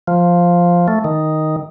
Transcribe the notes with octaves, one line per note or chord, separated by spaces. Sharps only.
F3
A3
D#3